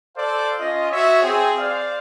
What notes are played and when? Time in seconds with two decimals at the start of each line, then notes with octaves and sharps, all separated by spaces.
0.16 A4 C5 D5 F5
0.59 C#4 F4 D#5
0.91 F#4 C#5 E5
1.23 C4 G#4
1.58 C5 D5 F5